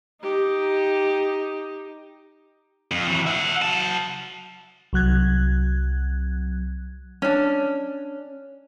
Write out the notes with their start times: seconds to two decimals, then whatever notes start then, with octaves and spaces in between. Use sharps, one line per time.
0.22 D#4 G4
2.91 F2
3.07 E3 F#3
3.27 E5 F#5
3.62 F#3 A5
4.93 C2 F#3 F#6 G#6
7.22 C#4 D4